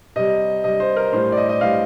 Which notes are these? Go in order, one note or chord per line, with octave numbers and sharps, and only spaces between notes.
C3 G3 D#5
C3 G3 D#5
C5
A#4
A2 G3 C5
D5
D#5
D#5
A2 G3 F5